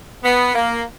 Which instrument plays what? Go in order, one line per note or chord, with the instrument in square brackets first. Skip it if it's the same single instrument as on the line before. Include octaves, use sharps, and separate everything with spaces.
[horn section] B3
A#3